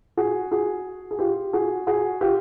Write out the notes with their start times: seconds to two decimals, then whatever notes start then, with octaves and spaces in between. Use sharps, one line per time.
0.17 F#4 G#4
0.52 F#4 G#4
1.11 G#4
1.19 F4 G4
1.53 F#4 G#4
1.87 F#4 G#4
2.21 F4 G4